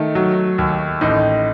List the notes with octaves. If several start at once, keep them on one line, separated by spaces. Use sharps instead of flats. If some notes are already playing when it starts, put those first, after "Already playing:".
Already playing: D#3 A3
F#3
D#2
A1 D#4